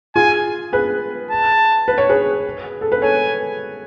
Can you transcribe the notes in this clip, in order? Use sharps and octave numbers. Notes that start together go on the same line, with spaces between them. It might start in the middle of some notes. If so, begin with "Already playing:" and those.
F4 G#4 G#5
G#4 B4
A5
B4
C#5
G#4 B4
A4
B4
A4 C#5 G#5